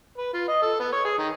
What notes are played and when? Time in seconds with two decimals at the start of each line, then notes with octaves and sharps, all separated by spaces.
0.18 B4
0.33 F4
0.48 D#5
0.62 A4
0.80 B3
0.92 C#5
1.05 G#4
1.18 D#3